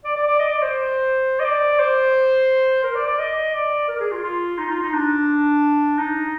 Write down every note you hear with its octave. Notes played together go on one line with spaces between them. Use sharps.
D5
D5
D5
D#5
D5
C5
D#5
D5
C5
A#4
D5
D5
D#5
D5
A#4
G#4
F4
F4
D#4
F4
D#4
D4
D#4